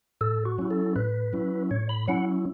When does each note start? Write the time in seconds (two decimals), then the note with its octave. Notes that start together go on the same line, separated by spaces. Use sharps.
0.21 A2 A4
0.45 F#4
0.58 F#3 C#4 E4
0.71 A4
0.96 A2 B4
1.33 F#3 C#4 E4
1.71 A2 C#5
1.89 B5
2.08 F#3 C#4 E4 F#5